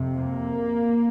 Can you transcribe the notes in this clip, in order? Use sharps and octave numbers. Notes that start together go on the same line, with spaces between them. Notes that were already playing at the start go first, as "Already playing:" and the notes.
Already playing: F2 C3
A#3